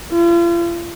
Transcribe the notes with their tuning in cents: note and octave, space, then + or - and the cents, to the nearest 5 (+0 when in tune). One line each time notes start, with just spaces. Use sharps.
F4 -40